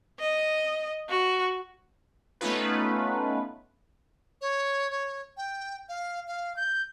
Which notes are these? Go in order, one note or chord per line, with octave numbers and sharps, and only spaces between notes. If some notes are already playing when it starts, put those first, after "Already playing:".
D#5
F#4
A3 B3 C#4 D#4 F4 B4
C#5
C#5
G5
F5
F5
G6